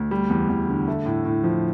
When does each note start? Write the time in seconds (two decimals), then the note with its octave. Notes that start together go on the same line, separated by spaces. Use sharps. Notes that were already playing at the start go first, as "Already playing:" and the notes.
Already playing: D2
0.11 G3
0.30 E2
0.49 E2
0.68 D3
0.88 A3
1.06 A2
1.25 A2
1.44 F3